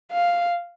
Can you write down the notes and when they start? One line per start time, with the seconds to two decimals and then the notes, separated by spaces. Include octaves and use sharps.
0.12 F5